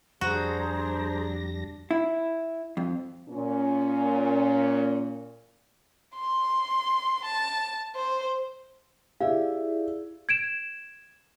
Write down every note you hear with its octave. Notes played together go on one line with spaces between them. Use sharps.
F2 G3 D4 F#4 G#4 C5 A#5 A#6
E4
F2
A#2 C#4
C6
A5
C5
E4 G4 G#4 D5 E5 F5
G#6 D7 E7